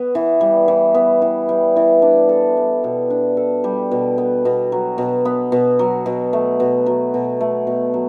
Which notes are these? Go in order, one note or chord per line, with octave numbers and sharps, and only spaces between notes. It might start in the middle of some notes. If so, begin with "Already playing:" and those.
Already playing: B3
E3
G3
E3
B3
E3
G3
E3
D4
A4
G3
B2
D4
A4
G3
B2
B3
B2
F#3
B2
B3
B2
F#3
B2
A3
B2
F#3
B2
A3
B2
F#3